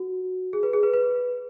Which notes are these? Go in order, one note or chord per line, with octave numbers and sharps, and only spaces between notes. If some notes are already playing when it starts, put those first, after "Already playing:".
Already playing: F#4
G#4
B4
G#4
B4
B4